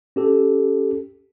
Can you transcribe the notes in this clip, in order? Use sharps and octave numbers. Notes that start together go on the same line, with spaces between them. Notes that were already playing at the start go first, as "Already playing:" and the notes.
C#4 G4 A4